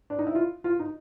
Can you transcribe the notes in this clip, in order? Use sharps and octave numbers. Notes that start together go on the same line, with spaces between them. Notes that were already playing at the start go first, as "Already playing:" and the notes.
D4
D#4
E4
F4
F4
D#4